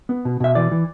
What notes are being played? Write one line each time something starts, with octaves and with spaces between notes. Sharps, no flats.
B3
B2
B2 E5
E3 D5
E3